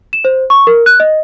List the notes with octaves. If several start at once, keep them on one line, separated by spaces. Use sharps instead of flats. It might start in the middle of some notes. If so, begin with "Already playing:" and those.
E7
C5
C#6
A#4
F#6
D#5